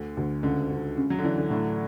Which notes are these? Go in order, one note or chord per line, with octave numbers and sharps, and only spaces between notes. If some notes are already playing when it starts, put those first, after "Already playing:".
Already playing: D2 D3
D2
C#2 D3
C#2
C#3
F#3
D3
E3 D4
D3
A2 D3